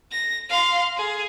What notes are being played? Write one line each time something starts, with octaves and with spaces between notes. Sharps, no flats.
A#6
F5 C6
G#4